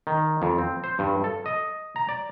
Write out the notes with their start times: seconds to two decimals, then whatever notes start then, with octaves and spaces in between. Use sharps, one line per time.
0.07 D#3
0.42 F2
0.58 C4
0.84 C5
0.99 G2
1.24 A4
1.46 D#5
1.96 A#5
2.09 D5